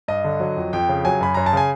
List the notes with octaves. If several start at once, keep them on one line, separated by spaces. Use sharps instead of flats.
G2 D#5
D3
F#3
F2
F2 G5
C#3
F#3 G#5
F#2 B5
F#2 A#5
A5
C#3 G#5